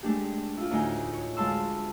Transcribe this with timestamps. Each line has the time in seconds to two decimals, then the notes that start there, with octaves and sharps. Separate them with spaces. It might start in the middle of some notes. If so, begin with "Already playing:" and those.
0.03 G#3 A3 D4 G4
0.57 E4 F4
0.71 D2 A2 D#4 G#5
1.13 C#5
1.37 D2 G#3 F5 A5 C6 E6